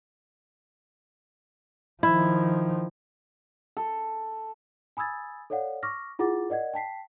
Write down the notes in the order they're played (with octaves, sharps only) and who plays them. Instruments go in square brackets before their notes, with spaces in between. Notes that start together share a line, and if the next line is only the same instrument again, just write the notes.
[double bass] D#3 F3 [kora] E4
[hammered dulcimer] A4
[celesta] G#5 B5 D#6 E6 G#6 A6
A4 C#5 D5 F5 F#5
C#6 D6 F6 A#6
E4 F4 G#4 F#5 D6 A6
A#4 D5 D#5 F#5 G#6
G5 A5 B6 C7